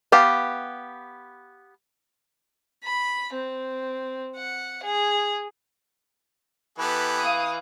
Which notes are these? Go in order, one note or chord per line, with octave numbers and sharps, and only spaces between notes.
B3 G4 F5 A5
B5
C4
F#5
G#4
E3 B3 G4 A4
F5 D#6